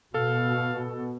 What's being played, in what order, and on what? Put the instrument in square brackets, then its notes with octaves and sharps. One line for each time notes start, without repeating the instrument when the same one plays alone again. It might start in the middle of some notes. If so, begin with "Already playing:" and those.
[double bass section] B2 [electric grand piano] A4 [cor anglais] F5